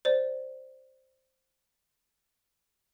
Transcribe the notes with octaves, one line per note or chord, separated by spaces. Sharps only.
C5 D5